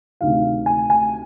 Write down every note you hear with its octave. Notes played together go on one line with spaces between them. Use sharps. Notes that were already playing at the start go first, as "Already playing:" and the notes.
D2 C3 D#3 F5
G#5
G#5